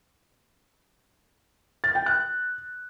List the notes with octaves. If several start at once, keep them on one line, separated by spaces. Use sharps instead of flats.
A6
G5
F#6